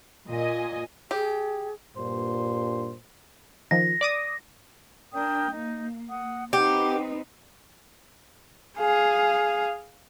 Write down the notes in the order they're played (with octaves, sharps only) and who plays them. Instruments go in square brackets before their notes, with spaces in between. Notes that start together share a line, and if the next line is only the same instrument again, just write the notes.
[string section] A#2 D#5 G#5
[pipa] G4 [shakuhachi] G#4
[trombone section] G2 A#2 [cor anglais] C5
[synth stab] D#3 F3 [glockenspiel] A#6
[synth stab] D5 D6 D#6
[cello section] D4 [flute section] A#4 G5 D#6
[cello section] A#3 [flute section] D#4
[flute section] F#5 D#6
[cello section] C4 D#4 B4 [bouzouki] G4 [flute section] F#5 D6
[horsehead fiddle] G#4 F5